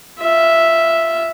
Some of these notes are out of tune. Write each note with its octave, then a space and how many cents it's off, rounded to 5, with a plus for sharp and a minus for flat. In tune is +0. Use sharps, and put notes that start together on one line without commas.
F4 -15 E5 +0